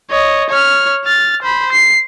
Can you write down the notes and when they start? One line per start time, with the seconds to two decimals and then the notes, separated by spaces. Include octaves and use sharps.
0.10 C#5 D#5
0.49 C#5 F6
1.05 F6 A6
1.42 C5 B5
1.72 C7